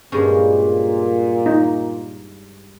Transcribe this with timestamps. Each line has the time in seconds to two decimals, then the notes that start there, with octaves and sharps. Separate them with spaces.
0.12 G2 A#2 G#3 C#4
1.46 D#4